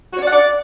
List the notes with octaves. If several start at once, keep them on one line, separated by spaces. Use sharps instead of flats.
F#4
C#5
D5
F#5
D5